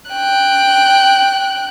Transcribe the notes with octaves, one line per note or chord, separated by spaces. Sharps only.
G5 F#6